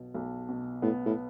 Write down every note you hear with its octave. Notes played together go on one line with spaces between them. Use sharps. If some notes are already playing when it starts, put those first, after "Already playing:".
Already playing: B1 B2
B1
B2
A2 B3
A2